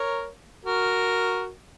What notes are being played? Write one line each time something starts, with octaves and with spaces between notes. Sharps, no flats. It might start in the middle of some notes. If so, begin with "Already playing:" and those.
Already playing: A#4 C#5
F#4 A#4